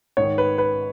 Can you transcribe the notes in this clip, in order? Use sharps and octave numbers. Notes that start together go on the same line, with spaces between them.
G#2 D#3 C#5
B4
B4